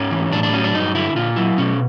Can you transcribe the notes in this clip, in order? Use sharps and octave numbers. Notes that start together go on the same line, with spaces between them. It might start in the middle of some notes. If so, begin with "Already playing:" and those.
Already playing: G#2 C#4
E3
A2 D4
D4
F#3 C#4
D4
G2 D#4
D3 E4
A#2 F4
F#3 E4
B2 C#4